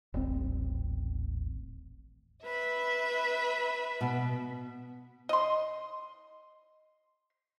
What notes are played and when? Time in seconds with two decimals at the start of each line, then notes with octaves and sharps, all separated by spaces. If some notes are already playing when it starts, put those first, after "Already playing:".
0.14 D#1 A1 C4
2.45 B4 E5 B5
4.01 B2
5.29 D#5 C6